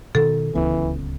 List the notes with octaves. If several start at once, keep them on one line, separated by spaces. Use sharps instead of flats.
B2 D#3 A4
D1 C#2 E3 B3